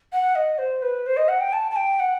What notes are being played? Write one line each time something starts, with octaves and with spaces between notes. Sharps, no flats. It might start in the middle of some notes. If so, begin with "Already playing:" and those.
F#5
D#5
C5
B4
C5
D#5
F#5
G5
A5
A5
G5
F#5